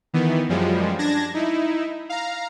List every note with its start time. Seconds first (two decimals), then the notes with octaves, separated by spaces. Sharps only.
0.13 D#3 E3 B3
0.49 F#2 F3 G3 G#3
0.98 D4 A5 G#6 A#6
1.34 D#4 E4
2.09 F5 A#5